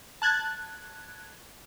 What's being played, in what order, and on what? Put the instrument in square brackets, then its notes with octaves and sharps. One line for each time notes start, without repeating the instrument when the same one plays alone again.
[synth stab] A5 F#6 G#6 A6